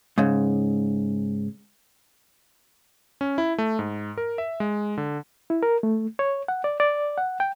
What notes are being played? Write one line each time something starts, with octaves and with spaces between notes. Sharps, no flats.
G#2 C#3
C#4
E4
A3
G#2
A#4
E5
G#3
D3
E4
A#4
A3
C#5
F#5
D5
D5
F#5
G5